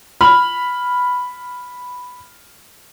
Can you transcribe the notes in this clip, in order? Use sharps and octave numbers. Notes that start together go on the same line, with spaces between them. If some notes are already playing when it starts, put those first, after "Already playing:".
B5 F6